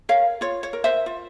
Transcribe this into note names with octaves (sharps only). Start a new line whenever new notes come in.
A#4 C#5 F5
F4 C#5
C#5
A#4
C5 E5
F4